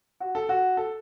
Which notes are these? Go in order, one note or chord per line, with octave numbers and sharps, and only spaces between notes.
F#4
A4
F#4
A4